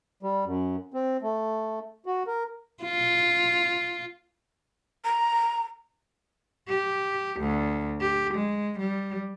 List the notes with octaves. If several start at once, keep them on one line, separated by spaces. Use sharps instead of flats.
G3
F#2
C4
A3
F#4
A#4
F4
A#5
G4
D2
G4
G#3
G3